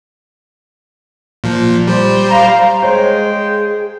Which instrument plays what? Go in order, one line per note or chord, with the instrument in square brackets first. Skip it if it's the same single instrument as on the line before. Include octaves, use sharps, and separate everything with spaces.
[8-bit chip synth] A#2 F3
G3 C5
[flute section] F5 A#5
[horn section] G#3 [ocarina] G#4 [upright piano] C5 C#5 [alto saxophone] G5